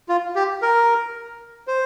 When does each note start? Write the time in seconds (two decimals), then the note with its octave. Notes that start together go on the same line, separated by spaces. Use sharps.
0.09 F4
0.36 G4
0.62 A#4
1.68 C5